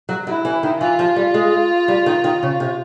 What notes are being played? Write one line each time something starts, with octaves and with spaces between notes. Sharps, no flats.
F#3
F#3 E4
E3
D#3
E3 F4
F3
G3
G#3
G3
D#3
D#3
C#3
C3